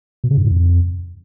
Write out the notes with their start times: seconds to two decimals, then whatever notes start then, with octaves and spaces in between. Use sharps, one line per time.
0.24 B2
0.31 C#3
0.38 G2
0.44 G#2
0.51 F2